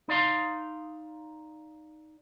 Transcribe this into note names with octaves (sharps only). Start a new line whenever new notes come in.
D#4 D5 F5 C6